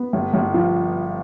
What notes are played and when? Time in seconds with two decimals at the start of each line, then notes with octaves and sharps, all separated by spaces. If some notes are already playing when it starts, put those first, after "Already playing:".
Already playing: B3
0.13 G1
0.34 G1
0.54 F3